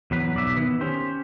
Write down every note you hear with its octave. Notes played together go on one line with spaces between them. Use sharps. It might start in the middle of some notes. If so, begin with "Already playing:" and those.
E2 F#3 B4
B1 D5 E5
D#3 B3
C#4 G4 C5